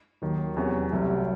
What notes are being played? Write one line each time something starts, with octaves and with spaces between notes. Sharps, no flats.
D#2 D#3 F#3
E2 C3 F#3 C#4 F#4
C2 C3 F#3 A3